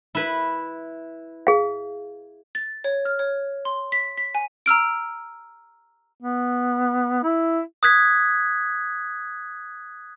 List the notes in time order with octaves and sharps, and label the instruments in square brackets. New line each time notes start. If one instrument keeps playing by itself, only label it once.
[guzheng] E4 B4
[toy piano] G#4 F5
[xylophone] A6
C#5
F6
C#5
C6
B6
B6
G#5
A#5 E6 F6 D7
[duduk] B3
E4
[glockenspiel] D#6 F#6 G#6 B6